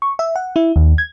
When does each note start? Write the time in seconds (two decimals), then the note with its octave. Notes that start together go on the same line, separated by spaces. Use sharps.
0.02 C#6
0.19 E5
0.36 F#5
0.56 E4
0.76 D#2
0.98 G#6